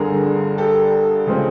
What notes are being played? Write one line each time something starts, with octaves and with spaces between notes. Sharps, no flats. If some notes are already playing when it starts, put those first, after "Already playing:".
Already playing: G1 G2 D3 G#4 A#4
G4 A4
C#3 F3 G#3 C4